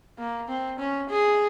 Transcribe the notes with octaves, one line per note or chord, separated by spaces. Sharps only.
A#3
C4
C#4
G#4